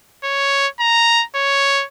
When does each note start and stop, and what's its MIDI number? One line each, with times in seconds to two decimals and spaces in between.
0.24 0.67 73
0.80 1.24 82
1.35 1.85 73